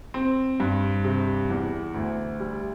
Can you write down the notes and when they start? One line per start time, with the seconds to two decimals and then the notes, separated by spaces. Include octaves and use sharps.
0.14 C4
0.60 G2
1.04 C3
1.50 E2
1.94 D2
2.40 G3